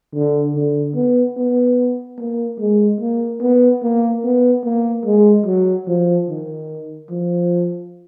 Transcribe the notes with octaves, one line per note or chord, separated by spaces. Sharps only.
D3
D3
B3
B3
A#3
G#3
A#3
B3
A#3
B3
A#3
G#3
F#3
F3
D#3
F3